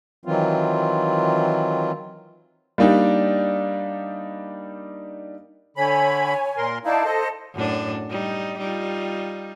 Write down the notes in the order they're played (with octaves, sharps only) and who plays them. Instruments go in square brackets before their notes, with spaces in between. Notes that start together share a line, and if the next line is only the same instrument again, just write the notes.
[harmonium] D#3 E3 F#3 C4 F4
[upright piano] G3 A#3 D4 D#4 G4
[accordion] D3 B5 [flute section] C#5 G#5
[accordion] A#2 A#4 C6
[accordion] D#4 E4 [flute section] D5 F5 A5
[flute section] A4 [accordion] C5 D#5
[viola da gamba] F#2 A2 D4
G3 D#4
G3 D#4 F4